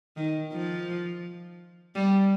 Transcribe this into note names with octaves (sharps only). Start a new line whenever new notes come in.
D#3
F3
G3